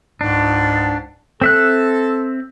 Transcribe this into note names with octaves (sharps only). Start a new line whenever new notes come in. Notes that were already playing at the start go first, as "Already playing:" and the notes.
C#2 G#2 D4
C4 A4 E5 F#6